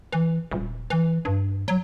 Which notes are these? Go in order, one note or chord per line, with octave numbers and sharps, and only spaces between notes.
E3
D#1
E3
G2
F#3